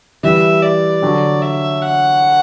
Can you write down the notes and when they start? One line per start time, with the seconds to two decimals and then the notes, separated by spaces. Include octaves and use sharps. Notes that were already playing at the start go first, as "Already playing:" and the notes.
0.23 E3 G3 E5
0.62 D5
1.02 D3 F#3
1.42 E5
1.82 F#5